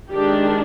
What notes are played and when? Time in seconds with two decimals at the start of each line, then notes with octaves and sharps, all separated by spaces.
0.11 D#3 G#3 D4 G4